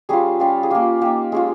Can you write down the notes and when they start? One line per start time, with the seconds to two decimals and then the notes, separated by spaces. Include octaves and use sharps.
0.09 G3 C#4 F4 G#4
0.40 G3 C#4 F4
0.63 G#4
0.70 A#3 F4 G4
1.01 A#3 D#4 G4
1.32 G#3 C#4 F4